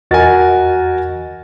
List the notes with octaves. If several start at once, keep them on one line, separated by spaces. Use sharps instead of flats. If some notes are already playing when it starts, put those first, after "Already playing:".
E2 F#4 A#4 D#5 G#5 A6